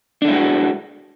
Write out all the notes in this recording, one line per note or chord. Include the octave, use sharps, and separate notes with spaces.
G#3 D4 E4 F#4 A4